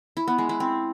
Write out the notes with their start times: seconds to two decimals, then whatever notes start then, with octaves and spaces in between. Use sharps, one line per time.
0.17 E4
0.27 B3
0.38 G#3
0.49 E4
0.60 C4